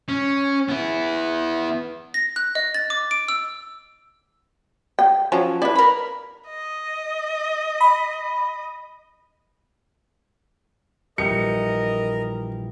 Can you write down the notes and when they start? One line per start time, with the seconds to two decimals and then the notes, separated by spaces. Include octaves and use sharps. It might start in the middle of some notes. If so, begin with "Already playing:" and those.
0.08 C#4
0.68 B3 E4
2.14 A#6
2.36 F#6
2.55 D#5
2.75 A6
2.90 D6
3.11 D7
3.28 E6
4.99 G5
5.32 F3 F#3 C#4
5.62 E4 B4 D5
5.75 A#4 B5
6.48 D#5
7.81 B5
11.18 A#1 E3 G3 A#4 D#5 C#7